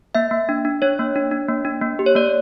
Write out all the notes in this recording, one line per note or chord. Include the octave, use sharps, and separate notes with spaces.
A#3 E5
A#3
D4
D4
D4 C#5
A#3
D4
D4
A#3
D4
A#3
G4
C#5
A#3 D5